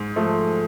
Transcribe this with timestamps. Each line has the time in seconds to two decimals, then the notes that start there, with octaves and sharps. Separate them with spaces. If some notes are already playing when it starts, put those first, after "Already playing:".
Already playing: G#2
0.16 F3 A3